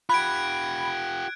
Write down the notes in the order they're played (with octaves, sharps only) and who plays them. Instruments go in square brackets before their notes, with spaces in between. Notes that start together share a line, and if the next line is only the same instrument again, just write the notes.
[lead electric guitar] F4 G4 [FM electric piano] B5 [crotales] F#6 G#6 D7